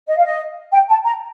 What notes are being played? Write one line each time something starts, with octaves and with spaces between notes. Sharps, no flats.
D#5
F5
D#5
G5
A5
A#5